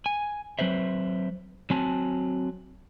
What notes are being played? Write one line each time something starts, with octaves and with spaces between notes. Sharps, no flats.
G#5
F#3 C4 B4 C5 E5
F#3 C4 G#5 A5